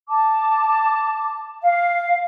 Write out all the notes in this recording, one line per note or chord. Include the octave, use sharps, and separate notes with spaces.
A5 D6
F5